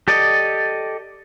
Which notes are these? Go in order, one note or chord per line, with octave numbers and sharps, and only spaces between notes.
G4 A4 D5 D#5